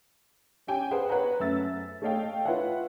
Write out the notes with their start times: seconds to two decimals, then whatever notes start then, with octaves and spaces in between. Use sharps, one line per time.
0.67 C#4 G4 G5 G#5
0.91 G#4 B4 C5 F5 F#5
1.09 B4 C#5 F#5 A#5
1.40 F#2 A3 E5 E6 A6
2.02 A3 C#5 D#5 F5 G5
2.45 F4 B4 C#5 E5 F#5